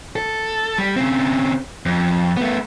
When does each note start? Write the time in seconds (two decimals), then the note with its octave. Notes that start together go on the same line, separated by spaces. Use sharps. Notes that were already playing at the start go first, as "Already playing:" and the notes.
0.16 A4
0.78 G3
0.96 C#3 C4
1.86 F2
2.37 A3 B3